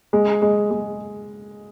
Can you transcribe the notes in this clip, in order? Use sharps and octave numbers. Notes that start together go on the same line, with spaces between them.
G#3
G#3
G#3